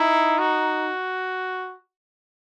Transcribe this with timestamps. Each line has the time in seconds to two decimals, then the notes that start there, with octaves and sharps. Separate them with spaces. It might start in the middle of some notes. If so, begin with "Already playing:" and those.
Already playing: D#4 E4
0.38 F#4